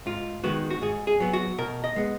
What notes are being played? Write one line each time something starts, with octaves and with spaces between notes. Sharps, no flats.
G#2 F4
D#3 G#3 B3 F#4
F#4
G#2 G#4
G#4
F#3 B3
F#4
B2 A#4
D#5
G#3 B3